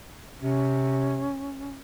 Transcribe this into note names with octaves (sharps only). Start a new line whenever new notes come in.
C3 C#4